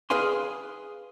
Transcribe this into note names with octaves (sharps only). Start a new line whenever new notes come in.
G#4 B4 F5 G#5 C6